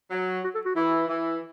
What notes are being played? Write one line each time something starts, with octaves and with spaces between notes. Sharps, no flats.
F#3
F#4
A4
F#4
E3 E4
E3